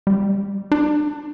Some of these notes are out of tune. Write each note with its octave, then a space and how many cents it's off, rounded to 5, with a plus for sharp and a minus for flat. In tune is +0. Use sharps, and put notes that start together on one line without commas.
G3 +25
D4 +35